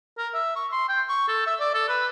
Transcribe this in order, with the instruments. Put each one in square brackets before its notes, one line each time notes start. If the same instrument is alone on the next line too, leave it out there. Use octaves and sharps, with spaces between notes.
[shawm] A#4
E5
C#6
C6
G5
C#6
A4
E5
D5
A4
B4